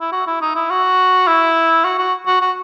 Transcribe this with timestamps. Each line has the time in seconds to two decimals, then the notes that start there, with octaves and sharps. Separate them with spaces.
0.01 E4
0.12 F#4
0.27 E4
0.41 D#4
0.55 E4
0.70 F#4
1.27 E4
1.84 F#4
1.98 F#4
2.26 F#4
2.41 F#4